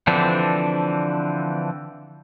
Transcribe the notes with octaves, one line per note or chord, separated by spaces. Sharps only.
D3 E3 F3 C4 D4